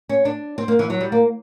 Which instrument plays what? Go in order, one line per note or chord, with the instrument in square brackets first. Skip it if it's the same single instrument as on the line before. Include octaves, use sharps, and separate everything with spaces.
[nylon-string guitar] C#4
D4
C4
A#3
E3
F#3
G3
A#3